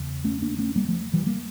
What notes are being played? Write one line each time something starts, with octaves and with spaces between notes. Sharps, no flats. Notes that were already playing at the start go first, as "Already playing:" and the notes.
Already playing: E2 C#3
A3 C#4
A#3 D4
A3 C#4
G3 A#3
F3 A3
E3 G3
G3 A#3